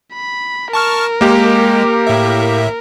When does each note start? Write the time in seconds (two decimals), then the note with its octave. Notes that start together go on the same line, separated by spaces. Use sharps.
0.14 B5
0.73 A#4 A5 C#6 F6
1.21 G#3 A#3 G4
2.07 A2 E5